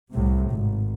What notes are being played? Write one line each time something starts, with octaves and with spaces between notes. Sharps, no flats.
C2 A2 C3
G#1